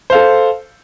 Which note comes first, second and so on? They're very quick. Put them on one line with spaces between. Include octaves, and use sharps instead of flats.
C5 F5 A4